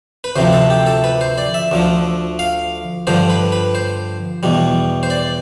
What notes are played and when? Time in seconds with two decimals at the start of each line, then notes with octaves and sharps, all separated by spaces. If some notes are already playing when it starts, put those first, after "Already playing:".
0.24 B4
0.36 D2 C3 F3 C5
0.53 A4
0.70 G4
0.86 A4
1.04 B4
1.21 C5
1.38 D5
1.54 E5
1.71 D2 D3 F3
2.39 F5
3.07 G2 D3 F3 C5
3.30 B4
3.52 B4
3.75 C5
4.43 E2 B2 G3
5.03 C5
5.10 D5